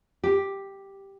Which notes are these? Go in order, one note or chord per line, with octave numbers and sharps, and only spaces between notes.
G4